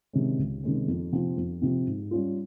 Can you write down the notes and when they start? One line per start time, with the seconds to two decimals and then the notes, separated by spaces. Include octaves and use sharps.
0.13 C3 D#3 G#3 C#4
0.39 C#2
0.63 C3 D#3 G#3 C#4
0.88 F2
1.12 C3 F3 C4
1.37 F2
1.62 C3 F3 C4
1.86 G#2
2.11 G3 C#4 F4